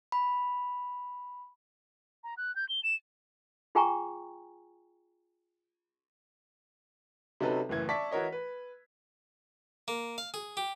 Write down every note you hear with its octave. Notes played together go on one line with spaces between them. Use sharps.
B5
A#5
F#6
G6
G7
E7
F4 G#4 G5 G#5 A#5 C#6
C3 F#3 C#4 D#4 A4 B4
F#1 A2 E3 G#6
D5 E5 A5 C#6 B6
E3 F#4 A#4 C#5 D#5
B4
A#3
F5
G#4
G4